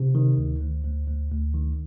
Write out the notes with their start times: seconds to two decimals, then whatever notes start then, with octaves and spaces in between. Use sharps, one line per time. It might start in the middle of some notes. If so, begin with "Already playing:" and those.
Already playing: C3
0.15 D#3
0.38 D2
0.61 D2
0.84 D2
1.07 D2
1.31 D2
1.54 D#3